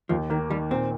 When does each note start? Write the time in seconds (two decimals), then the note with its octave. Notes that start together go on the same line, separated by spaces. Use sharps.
0.09 D#2 F3
0.30 D#3 A#3
0.50 D#3 G3
0.71 A#2 C4